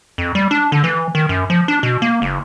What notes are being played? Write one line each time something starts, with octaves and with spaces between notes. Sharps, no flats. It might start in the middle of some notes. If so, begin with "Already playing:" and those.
F2
G3
D4
D3
E3
D#3
F#2
F3
D4
B2
A#3
F#1